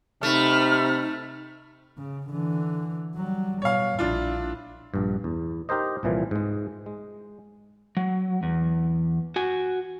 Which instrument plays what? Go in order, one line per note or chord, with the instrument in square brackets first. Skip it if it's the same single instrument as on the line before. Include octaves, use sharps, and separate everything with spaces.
[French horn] C3 [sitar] A3 [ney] D#4 [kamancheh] B5 F6
[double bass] C#3
D3 E3
F#3 G3
[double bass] B2 [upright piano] C#5 F5
[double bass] A#1 E4 [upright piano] D4 F4
[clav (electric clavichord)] A#1 G2
E2
D#4 G4 A#4 C5 D#5
C2 A#2 E3 F3
G#2 G#3
G#3
[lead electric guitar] F#3
E2
F#4 G#5